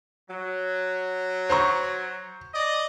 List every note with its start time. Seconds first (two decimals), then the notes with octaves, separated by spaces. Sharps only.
0.29 F#3
1.50 C5 A#5 C#6
2.54 D5 D#5